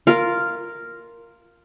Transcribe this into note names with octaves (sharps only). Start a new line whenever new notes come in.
F4 A#4